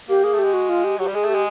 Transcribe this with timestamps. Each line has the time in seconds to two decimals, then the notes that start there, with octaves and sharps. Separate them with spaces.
0.09 A#3 G4
0.24 A#3 G#4
0.34 A3 G4
0.44 G#3
0.54 F#4
0.69 F4
0.84 G4
0.98 F#3 G4
1.07 G3
1.14 G#3 G#4
1.24 A3 G4
1.35 G#3